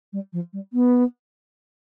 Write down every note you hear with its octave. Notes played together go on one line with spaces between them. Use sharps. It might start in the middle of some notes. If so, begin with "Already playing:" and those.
G3
F3
G3
B3